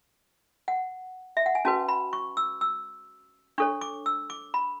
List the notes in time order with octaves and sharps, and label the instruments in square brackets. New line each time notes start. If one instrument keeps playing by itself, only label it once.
[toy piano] F#5
E5
F#5
G#5
C#4 F#4 B4 A5
B5
C#6
E6
E6
D4 A4 C#5 C#6
D6
E6
D6
B5